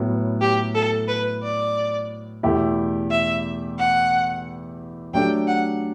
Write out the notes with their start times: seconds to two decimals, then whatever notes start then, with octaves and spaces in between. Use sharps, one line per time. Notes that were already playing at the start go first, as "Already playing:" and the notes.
Already playing: A2 F#3 B3
0.41 G4
0.75 A4
1.08 B4
1.43 D5
2.43 E2 B2 A3 E4 G4
3.10 E5
3.78 F#5
5.14 F#3 A3 D4 G4 G5
5.47 F#5